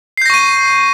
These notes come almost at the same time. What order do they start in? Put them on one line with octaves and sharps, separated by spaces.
C7 G6 A#6 C#6 D#7